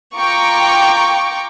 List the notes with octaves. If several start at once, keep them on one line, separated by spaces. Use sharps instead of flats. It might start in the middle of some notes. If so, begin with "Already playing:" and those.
F4 G5 A#5 C#6 D6